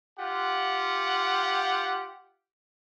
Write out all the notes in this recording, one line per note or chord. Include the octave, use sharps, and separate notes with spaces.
F4 G4 F#5